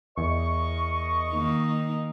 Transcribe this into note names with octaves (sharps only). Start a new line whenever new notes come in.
E2 A#4 D#5 C#6
D#3 A#3 D#4